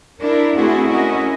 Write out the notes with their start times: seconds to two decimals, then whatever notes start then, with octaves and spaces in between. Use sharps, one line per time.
0.21 D4 E4 A#4
0.56 A3 C4 E4 F#4 G#4 A4
0.88 C#4 E4 F#4 A#4 D#5